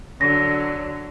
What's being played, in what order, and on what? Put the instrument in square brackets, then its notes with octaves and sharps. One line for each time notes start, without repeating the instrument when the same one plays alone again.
[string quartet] D3 F#3 [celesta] A#6